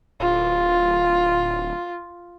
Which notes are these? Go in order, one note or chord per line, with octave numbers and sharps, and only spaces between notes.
D1 F4